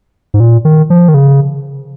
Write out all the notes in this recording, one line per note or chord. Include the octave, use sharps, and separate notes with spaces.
G#2
A#2
D#3
F3
D#3
C#3